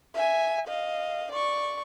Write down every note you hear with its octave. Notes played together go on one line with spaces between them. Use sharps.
E5 G#5
D#5 F5
D5 C#6